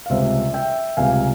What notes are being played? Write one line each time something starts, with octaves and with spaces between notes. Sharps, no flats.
F5
C#2 C3 G3 C5 E5
E5 G5
C#2 C3 G3 F5 G#5